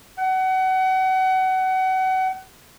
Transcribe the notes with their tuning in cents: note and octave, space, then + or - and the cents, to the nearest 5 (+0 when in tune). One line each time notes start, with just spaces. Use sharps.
F#5 +30